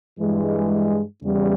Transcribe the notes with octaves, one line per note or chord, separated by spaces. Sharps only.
G2 E3 G#3
E2 C#3 E3 G3